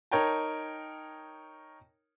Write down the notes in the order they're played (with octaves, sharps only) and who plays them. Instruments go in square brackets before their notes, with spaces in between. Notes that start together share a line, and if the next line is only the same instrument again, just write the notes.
[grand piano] D#4 A#4 C#5 G5 A5